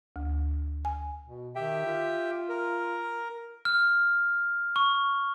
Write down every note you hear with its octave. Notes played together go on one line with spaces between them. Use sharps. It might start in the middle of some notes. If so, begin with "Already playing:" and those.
D2
G#5
B2
D#3 G4 E5 G5
F4
A#4
F6
C#6